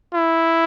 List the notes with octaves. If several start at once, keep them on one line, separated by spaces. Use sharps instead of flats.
E4